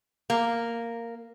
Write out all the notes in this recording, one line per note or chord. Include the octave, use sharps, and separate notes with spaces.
A#3